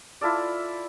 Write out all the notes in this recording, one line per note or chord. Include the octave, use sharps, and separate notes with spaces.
E4 F4 A4 D5